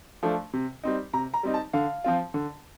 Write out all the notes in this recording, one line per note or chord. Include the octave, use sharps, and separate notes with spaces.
F3 A3 D4
C3
G3 C4 D#4
C3 A#5
A#5
G3 C4 D#4
A5
D3 F5
F3 C4 F4
D3